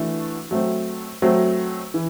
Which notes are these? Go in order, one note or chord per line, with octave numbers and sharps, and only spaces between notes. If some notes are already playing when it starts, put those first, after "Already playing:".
Already playing: E3 A3 D4 F#4
F#3 A3 C4
F#3 A3 C4
E3